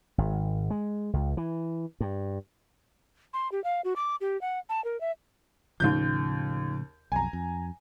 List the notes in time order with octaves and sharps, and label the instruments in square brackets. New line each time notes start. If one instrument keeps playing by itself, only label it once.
[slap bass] G#1
G#3
C#2
E3
G2
[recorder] C6
G4
F5
F#4
D6
G4
F#5
A5
A#4
E5
[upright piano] D#2 G6 [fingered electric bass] A2 C#3 F3
[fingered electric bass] B1 F2 [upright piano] G#5 A#5
[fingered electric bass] F2